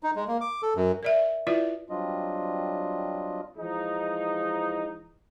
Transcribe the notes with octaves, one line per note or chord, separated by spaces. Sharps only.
D#4
G#3
A#3
D6
A4
F#2
A#4 D5 E5
E4 F4 B4 D5 E5
F#3 G3 C4 D4 F4 D#5
E3 F3 G#3 D#4